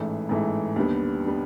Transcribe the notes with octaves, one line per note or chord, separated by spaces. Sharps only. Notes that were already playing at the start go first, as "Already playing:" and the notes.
Already playing: A1 G#2 E3 A3
A1 G#2 E3 A3
D#2 D3 G3 B3
D3 G3 B3